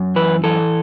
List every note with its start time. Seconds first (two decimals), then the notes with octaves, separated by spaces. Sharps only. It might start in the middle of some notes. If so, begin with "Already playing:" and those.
Already playing: F#2
0.16 E3 B4
0.44 E3 A4